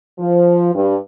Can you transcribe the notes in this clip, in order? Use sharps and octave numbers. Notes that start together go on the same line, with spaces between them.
F3
G2